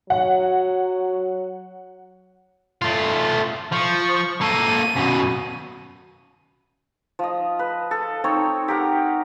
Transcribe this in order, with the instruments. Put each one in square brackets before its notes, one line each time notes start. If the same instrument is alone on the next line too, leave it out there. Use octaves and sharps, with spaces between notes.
[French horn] F#3 [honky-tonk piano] F#5
[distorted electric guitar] A3 F4
[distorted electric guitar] F3 [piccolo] C#6
[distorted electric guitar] A#3 A4 [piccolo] D#7
[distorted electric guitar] F#2 B2
[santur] F3 D#5
B4
A4
C4 D#4 C#5
G4 A#4 F#5